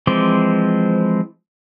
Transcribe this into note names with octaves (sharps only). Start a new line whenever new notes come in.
E3 F3 G#3 C4 D6